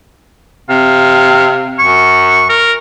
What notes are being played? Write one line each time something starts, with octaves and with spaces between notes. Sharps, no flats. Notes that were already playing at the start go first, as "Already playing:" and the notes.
C3 F5
F#2 C#6
A#4